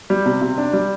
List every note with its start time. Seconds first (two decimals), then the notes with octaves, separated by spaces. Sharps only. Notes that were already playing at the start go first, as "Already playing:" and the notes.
0.10 G3
0.26 C3
0.41 C3
0.58 D4
0.73 G3